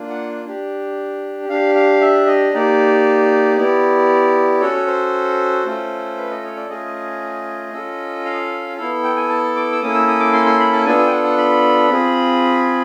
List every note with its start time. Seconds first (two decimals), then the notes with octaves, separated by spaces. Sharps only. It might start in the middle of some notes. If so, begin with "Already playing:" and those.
Already playing: A#3 D4 F4
0.10 F#5
0.45 D4 G4
1.49 D4 G4 F5
1.75 F5
2.01 E5
2.26 D#5
2.53 A#3 D#4 G4 D5
3.57 B3 E4 G4 D5
4.61 C#4 F#4 A4 C#5
4.76 C#5
4.87 C5
5.65 A3 C#4 F4 A4
6.17 B4
6.30 D#5
6.43 C#5
6.56 D5
6.69 A3 C#4 F4 G#4 D#5
7.73 C#4 F4 A4
8.25 F5
8.77 B3 E4 A4 F5
9.04 G5
9.16 G#5
9.29 A5
9.56 D6
9.72 E6
9.81 A#3 C#4 E4 A4 D#6
9.94 E6
10.08 D#6
10.20 D6
10.33 C6
10.46 C6
10.60 B5
10.73 A5
10.85 B3 D4 F4 A4 G#5
10.98 G#5
11.07 G5
11.11 F#5
11.24 F#5
11.38 B5
11.89 C4 F4 G#4